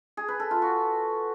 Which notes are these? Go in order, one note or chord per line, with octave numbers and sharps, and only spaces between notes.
G#4
B4
A4
F4
F#4